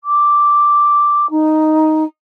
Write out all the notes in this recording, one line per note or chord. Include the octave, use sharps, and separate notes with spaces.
D6
D#4